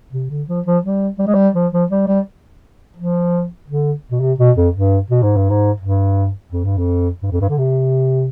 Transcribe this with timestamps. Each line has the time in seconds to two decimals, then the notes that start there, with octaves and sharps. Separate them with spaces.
0.13 C3
0.30 D3
0.48 F3
0.66 F3
0.84 G3
1.19 G3
1.27 G#3
1.34 G3
1.55 F3
1.72 F3
1.91 G3
2.08 G3
2.97 F3
3.68 D3
4.11 B2
4.20 C3
4.39 B2
4.57 F2
4.74 G2
5.10 B2
5.23 G#2
5.36 G2
5.50 G#2
5.80 G2
6.52 F2
6.65 G2
6.78 F2
7.23 G2
7.32 F2
7.41 G2
7.49 D3
7.58 C3